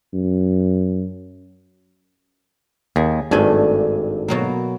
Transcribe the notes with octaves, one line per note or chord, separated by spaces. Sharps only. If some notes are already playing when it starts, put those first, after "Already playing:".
F#2
D#2 G#4
G#1 G2 A3 D4 G#5
B2 F#3 A#3